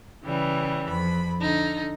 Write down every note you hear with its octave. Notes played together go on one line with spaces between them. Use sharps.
C#3 E3 G3
F2 B5
D3 D#4